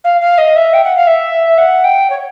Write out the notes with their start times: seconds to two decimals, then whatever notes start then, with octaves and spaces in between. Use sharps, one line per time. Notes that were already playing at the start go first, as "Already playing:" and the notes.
0.04 F5
0.21 F5
0.37 D#5
0.56 E5
0.73 G5
0.84 F#5
0.96 F5
1.06 E5
1.58 F#5
1.84 G5
2.09 C#5